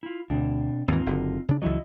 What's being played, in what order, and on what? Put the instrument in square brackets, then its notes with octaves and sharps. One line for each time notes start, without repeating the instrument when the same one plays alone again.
[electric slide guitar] E4 F4
[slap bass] D2 [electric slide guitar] B2 C4 D4
[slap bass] D#2 G#2 E3 [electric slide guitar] C4 D#4 F4
[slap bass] F#1 D3
C#3 D4
[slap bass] C#2 E3 F#3 [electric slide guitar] E4 F#4 D#5